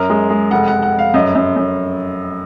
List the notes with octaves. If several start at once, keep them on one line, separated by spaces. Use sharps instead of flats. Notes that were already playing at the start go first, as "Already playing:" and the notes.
Already playing: F#2 A#4
G#3
G#3
F1 F#5
F1 F#5
F#5
F1 F5
F#2 D#5
F#2
F#2